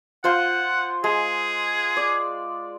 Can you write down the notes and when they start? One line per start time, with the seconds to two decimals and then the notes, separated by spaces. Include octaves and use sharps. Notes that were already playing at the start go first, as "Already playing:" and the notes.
0.24 F4 C5 F#5 C6
1.04 G#3 G#4
1.97 D5